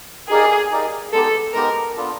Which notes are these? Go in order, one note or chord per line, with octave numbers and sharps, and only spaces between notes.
D#4 G4 G#4 A#4 D5 F5
D#4 G4 A#4 D5 F5
G#3 B3 D#4 G4 A4
G#3 B3 D#4 G4 A#4
B3 D4 F4 A4